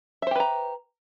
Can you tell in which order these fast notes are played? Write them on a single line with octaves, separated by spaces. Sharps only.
E5 C5 G4 B4 A#5